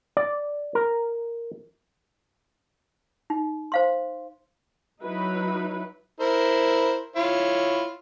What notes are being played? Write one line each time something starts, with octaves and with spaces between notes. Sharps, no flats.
D5
A#4
D#4
C5 F5 C6
F#3 D#4 E4 B4
E4 A#4 C5
E4 F4 C#5